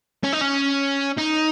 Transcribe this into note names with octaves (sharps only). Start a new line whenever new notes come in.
C#4
D#4
C#4
D#4